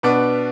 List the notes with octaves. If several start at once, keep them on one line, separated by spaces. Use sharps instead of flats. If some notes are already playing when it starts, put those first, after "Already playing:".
B2 B3 D4 B4